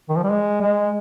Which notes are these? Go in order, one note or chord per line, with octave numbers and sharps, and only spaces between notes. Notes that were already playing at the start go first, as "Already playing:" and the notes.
D#3
F3
G3
G#3
G#3